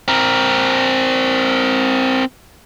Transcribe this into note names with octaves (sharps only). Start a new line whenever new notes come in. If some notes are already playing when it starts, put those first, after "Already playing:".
C4 A#4